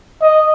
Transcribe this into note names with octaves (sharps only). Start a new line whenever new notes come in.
D#5